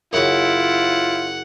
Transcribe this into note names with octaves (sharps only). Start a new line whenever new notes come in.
F#2 C#3 E4 F4 F#5